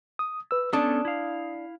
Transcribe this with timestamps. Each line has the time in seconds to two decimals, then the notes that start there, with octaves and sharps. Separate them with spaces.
0.19 D#6
0.51 B4 E6
0.73 B3 C#4 D4 A4 D#6
1.05 E4 F5